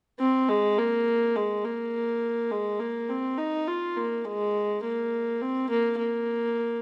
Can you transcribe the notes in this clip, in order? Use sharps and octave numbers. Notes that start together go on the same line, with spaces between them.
C4
G#3
A#3
G#3
A#3
G#3
A#3
C4
D#4
F4
A#3
G#3
A#3
C4
A#3
A#3